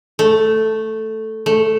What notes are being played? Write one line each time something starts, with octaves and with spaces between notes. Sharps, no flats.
A3
A3